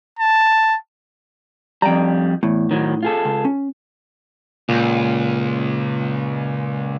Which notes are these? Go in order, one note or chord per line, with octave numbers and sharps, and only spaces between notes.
A5
F2 G3 G5 A#5
E2 A2
D#3 F#3
F4 G#4 A4
C#2
C#4
C#2 A#2